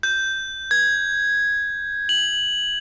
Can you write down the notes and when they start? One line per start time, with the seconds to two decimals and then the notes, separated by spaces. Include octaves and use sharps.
0.03 G6
0.71 G#6
2.09 F#7